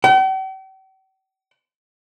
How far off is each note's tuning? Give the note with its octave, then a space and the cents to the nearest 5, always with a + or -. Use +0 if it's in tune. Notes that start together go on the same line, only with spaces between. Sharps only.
G5 -45